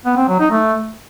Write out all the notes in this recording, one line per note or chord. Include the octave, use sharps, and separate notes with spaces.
B3
C4
F#3
D#4
A3